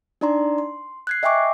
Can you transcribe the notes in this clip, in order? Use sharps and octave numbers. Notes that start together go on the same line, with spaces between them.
D4 D#4 D5 A#5 C6
C6
F#6 G#6 C7
D#5 E5 G5 G#5 C#6 D6